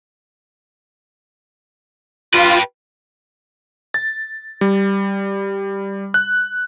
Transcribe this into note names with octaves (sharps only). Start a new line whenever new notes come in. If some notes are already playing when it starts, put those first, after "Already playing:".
F4 G4 B4
A6
G3
F#6